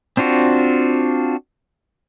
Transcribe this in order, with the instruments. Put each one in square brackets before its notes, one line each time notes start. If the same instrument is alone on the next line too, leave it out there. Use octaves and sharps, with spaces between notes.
[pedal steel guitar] C4 D4 F4 F#4